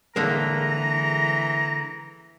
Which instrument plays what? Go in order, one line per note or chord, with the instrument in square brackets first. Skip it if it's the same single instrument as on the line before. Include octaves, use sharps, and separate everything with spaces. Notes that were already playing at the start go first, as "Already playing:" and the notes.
[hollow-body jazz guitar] D3 G#3 A#3 [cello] E3 [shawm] A#5